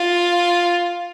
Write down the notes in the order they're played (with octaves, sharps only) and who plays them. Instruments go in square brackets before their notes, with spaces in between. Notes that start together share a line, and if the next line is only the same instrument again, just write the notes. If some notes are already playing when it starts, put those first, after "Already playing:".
Already playing: [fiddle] F4